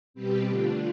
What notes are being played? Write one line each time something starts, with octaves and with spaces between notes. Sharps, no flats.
B2 G3 C4 G4 B4
D3 A3 D4 F4